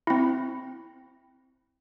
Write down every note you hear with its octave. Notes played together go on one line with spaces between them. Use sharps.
C4 E4